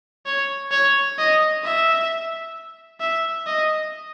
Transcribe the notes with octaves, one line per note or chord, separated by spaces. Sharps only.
C#5
C#5
D#5
E5
E5
D#5